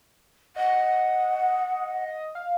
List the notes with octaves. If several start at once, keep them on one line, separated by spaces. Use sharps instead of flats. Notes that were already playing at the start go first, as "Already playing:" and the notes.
D#5 F#5
F5